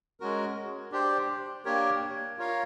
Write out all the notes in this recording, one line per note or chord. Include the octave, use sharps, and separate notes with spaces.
G#3 C#4 F#4 A#4
D4 G4 C5
A#3 D4 G4 A#4 C#5
F4 A#4 C#5 F5